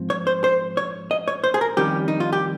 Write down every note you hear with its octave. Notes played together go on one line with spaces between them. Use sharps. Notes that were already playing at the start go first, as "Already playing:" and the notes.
Already playing: G#2 F3 C4
C#5
C5
C5
C#5
D#5
C#5
C5
G#4
A#4
F2 D#3 G3 C#4 G4
D#4
F4
G4